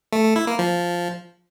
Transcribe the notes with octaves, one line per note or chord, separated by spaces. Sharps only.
A3
A3
E4
A#3
F3